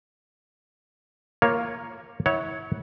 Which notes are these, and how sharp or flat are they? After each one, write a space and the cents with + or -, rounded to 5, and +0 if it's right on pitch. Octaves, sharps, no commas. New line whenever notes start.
A#3 +0 F4 -5 C#5 +0
E4 -35 C#5 +0 F#5 +0